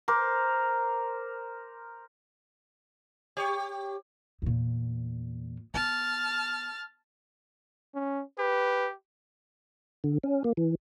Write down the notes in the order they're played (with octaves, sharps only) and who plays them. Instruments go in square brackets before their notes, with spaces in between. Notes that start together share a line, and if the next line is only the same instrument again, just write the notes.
[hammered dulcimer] A#4 C5 D6
[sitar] G4 C#5
[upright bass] E2 A#2
[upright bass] B3 [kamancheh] A5 F6
[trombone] C#4
[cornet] G4 [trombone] B4
[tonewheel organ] D3
C#4
A#3
E3